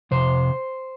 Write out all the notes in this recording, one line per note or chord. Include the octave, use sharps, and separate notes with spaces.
F2 C3 C5